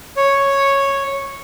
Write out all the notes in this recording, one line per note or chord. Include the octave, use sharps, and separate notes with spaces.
C#5